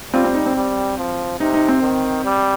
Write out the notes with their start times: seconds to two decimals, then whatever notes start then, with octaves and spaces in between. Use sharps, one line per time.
0.13 G3 C4 F4
0.24 C4
0.34 D#4
0.46 C4
0.56 G3
0.98 F3
1.40 C3 D#4
1.54 D#4
1.68 C4
1.82 D#3
2.24 G3